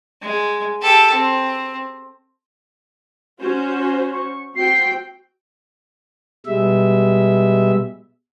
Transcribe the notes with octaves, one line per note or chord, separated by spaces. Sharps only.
G#3
G4 A4
C4
C#4 F#4 C5
C#6
C4 F#4 G5 C7
B2 G3 G#3 E5